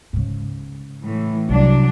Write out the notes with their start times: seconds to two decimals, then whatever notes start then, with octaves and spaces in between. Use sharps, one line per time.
0.13 G#2 C#3
1.03 A2 E3
1.49 C2 F#3 D4